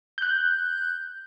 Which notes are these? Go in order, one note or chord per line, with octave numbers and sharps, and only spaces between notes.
F#6 G6